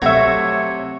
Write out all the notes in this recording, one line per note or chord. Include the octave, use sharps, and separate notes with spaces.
C3 F#3 G3 A3 F#4 C#5 E5